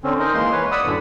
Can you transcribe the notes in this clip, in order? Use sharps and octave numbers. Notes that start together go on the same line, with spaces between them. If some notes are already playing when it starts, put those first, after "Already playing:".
D3 C4 C#4
D#4 A#4 C5 D#5
E3 G#3 A#3 C6
B4 C#5
D5 F#5 B5 D#6 E6
F#2 A2 D3